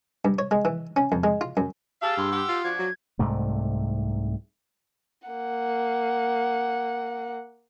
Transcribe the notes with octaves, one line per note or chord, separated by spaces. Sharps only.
G2
C#5
G#3
E3
C#4
F2
G#3
F4
F#2
G4 G#4 F5 A5 E6
G2 C6
G4 F#5
F4
F3 D4 F#4 G#6
F#3
C2 G#2 C3 A3
A#3 F#5